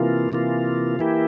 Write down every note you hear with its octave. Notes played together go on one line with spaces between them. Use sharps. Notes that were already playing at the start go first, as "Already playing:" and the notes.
Already playing: C3 E3 A#3 F4
C3 E3 A#3 F4
E3 A#3 E4 G4